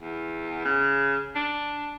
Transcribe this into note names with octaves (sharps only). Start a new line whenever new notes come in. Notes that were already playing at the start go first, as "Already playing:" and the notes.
E2
C#3
D4